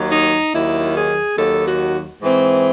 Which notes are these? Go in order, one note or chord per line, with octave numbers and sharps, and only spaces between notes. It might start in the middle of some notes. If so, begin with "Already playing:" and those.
Already playing: D#2 D#3 F#3
D#4
D#2 D#3 F#3 E4
G#4
D#2 D#3 F#3 A4
F#4
G#2 E3 C4